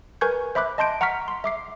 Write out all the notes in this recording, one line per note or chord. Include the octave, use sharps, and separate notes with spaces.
A#4 B4 G#5 C#6 G6 G#6
C5 E5 B5 D6 F#6
D#5 A5 C6 G6 D7
F#5 A#5 C#6 F6 B6
C6
E5 D6 C7